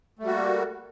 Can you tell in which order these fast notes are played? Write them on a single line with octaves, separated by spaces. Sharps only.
A3 G3 F#4 A#3